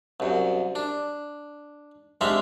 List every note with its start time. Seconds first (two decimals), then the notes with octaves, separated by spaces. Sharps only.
0.20 C2 F#2
0.75 D4
2.21 G3 G#3 C4 D4 E5 F5